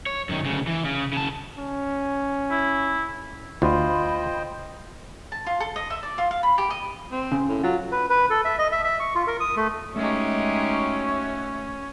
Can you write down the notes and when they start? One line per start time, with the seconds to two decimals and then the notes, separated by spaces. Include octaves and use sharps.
0.06 C#5
0.29 F#2 D#3
0.44 D2 C#3
0.67 E3
0.85 C#3
1.13 C#3 A5
1.59 C#4
2.51 E4
3.62 D2 F4 C5 D#5 G5 B5
5.32 A5
5.46 F4
5.60 A4
5.76 D#5
5.90 E5
6.03 D5
6.18 F4
6.31 F5
6.43 B5
6.58 G4
6.70 D#5
7.12 C4
7.32 C#3
7.49 A2
7.64 F#3 F4
7.92 B4
8.10 B4
8.30 A4
8.45 E5
8.59 D#5
8.72 E5
8.84 E5
9.00 C#6
9.15 F4
9.27 A#4
9.40 D#6
9.56 A3
9.96 G#3 A3 C#4 D#4 F#4 G4 C#5 E5